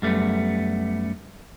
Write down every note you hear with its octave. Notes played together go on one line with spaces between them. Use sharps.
F#2 G3 A3 B3